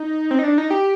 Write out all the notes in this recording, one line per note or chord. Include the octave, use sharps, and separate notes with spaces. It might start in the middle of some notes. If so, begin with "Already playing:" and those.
Already playing: D#4
C4
D#4
D4
D#4
G4